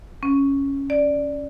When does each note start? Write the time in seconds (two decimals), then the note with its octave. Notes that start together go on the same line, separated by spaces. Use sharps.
0.23 C#4
0.90 D5